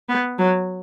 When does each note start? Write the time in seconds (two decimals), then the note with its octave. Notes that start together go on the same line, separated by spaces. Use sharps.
0.09 B3
0.38 F#3